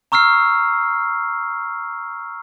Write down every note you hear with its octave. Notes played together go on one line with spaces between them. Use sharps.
A#5 C#6 E6 F6 C7